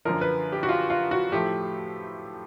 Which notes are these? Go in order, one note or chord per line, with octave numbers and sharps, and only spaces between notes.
F#2 D3 F3 A#4
B4
G4
F#4
F4
F4
F#4
A2 F3 A3 G4